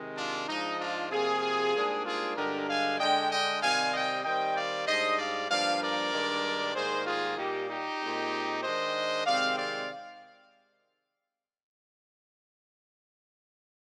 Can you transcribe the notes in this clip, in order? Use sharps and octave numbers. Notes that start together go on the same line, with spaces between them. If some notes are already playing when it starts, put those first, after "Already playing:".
Already playing: C3 D#3 G#3
D4 F4
G#2 F3 G#3 D4 D#4
D4 F4
C3 F3 A#3 F4 G#4
G#2 G3 A#3 D4
F4 G#4
G2 D3 G#3 D4 G4 A#4
F5 G#5
D3 G#3 D4 D#5 G5
D#5 G5
C3 D#3 G3 C4 F5 G#5
D#5 G5
D#3 G3 C4 D#5 G5
D5 F5
G#2 G3 D4 C5 D#5
D5 F5
G2 F3 A#3 D4 D5 F5
A#4 D5
G2 D#3 G#3 D4
G#2 D#3 G3 A#3 G#4 C5
F4 G#4
A#2 G3 A#3 D#4 G4
D#4 G4
A#2 G#3 C4
D#3 G#3 D4 C5 D#5
C3 D#3 G#3 C4 D5 F5
D5 F5